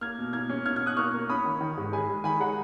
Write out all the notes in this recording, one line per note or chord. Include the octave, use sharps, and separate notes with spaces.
A#3 F6 G#6
B2
A#3 F6 G#6
C#4
B2 F6 G#6
B2 F6 G#6
D#6 F#6
A#3 C#6 F6
A#3
C#4 B5 D#6
D#3
D#3
G#2
G#3 G#5 B5
G#3
D#3 G#5 B5
G#3 F#5 A#5